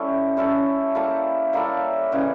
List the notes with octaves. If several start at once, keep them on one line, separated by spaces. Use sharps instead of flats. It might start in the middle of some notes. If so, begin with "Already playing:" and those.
Already playing: G3 C#4 E4 A4
G3 C#4 E4 A4
G3 A#3 E4 A4
G3 A#3 E4 A4
C#3 E3 G3